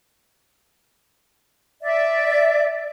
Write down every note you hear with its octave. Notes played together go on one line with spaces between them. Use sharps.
D5 E5